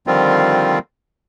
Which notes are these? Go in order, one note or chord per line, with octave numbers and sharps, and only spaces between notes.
D3 D#3 F3 G3 C4 F4